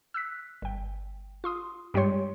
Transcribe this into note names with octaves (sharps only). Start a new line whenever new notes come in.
E6 F#6 B6
G1 G5
F4 C6 D#6
G2 G3 G#3 G4 C#5 C6